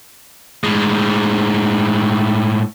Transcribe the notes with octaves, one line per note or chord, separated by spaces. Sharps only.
A2 G#3